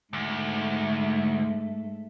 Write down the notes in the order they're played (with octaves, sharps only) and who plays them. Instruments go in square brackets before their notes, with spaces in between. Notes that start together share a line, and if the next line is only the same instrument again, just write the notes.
[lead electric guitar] D2 [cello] G#2 A3